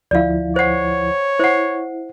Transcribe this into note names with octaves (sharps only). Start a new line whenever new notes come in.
D2 F3 E4 D5 F5
C5 C#5 F#5
E4 C5 F#5